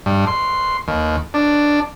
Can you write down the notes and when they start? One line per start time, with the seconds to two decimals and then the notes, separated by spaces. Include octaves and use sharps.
0.06 G2
0.27 C6
0.88 D#2
1.34 D4